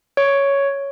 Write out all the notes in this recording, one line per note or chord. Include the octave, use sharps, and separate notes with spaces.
C#5